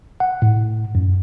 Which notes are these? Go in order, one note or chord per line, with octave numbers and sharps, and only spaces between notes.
F#5
A2
F#2